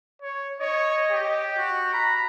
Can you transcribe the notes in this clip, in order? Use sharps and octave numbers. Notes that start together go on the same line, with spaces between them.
C#5
C#5 D#5
G4
F#4
A#5 B5